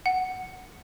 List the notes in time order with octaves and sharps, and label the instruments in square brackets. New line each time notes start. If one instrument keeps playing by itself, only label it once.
[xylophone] F#5